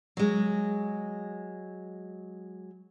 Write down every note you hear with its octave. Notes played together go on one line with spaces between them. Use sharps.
F#3 G#3